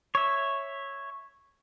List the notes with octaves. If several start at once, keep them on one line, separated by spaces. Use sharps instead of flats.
C#5 E5